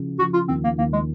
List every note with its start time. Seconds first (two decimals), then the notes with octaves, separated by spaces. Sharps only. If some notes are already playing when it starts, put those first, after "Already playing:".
Already playing: C#3 F3
0.19 F3 F#4
0.33 F4
0.48 D#2 C4
0.64 A#3
0.78 D#2 A#3
0.93 G#3